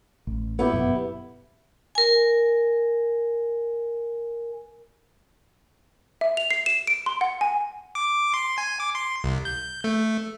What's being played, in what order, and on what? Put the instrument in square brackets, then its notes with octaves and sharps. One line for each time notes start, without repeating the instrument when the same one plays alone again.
[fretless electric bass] A1
[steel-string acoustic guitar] B3 E4 G4
[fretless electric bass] G1 F#2 B2
[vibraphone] A#4 G#5
[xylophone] E5
F7
C7
E7
D7
C6
F#5
G#5
[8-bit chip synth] D6
C6
G#5
D6
C6
C2
G6
A3